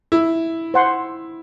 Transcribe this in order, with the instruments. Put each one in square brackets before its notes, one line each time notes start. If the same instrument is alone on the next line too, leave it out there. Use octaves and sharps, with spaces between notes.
[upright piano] E4
[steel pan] C5 F#5 C6